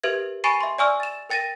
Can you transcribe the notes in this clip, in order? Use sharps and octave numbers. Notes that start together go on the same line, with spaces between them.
G4 A#4 B4 E5 G#6
G#5 B5 C#6 A6 C7 D#7
E5 C6
D5 E5 G#5 C#6 E6 F6
A6 E7
A#4 G5 A6 A#6 D#7